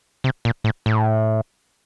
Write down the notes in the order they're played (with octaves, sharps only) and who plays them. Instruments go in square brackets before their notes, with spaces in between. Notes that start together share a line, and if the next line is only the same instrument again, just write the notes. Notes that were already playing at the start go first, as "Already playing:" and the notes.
[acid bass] C3
A#2
A2
A2